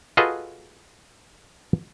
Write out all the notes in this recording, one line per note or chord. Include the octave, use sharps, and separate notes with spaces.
F4 F#4 G#4 A4 B4 D#5